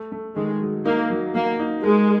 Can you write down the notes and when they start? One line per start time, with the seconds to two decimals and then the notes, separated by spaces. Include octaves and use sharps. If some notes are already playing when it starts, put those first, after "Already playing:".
Already playing: A3
0.12 A3
0.36 D#3 G#3
0.61 F#3
0.86 A#3 D#4
1.10 F#3
1.35 F#3 A#3
1.60 D#4
1.84 G#3 A#4